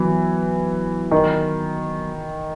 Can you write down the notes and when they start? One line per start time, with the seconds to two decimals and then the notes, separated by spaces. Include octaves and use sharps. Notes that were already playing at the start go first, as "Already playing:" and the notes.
Already playing: E3 F#3 B3 F#4
1.11 D#3